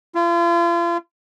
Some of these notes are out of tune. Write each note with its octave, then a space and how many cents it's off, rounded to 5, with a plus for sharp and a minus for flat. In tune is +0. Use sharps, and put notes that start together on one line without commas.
F4 -40